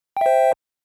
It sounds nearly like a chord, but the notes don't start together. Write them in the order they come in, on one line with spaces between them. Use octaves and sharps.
G5 E5 C5